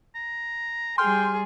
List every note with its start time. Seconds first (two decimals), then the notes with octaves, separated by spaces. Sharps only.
0.15 A#5
0.98 G3 G#4 G5 C6 F6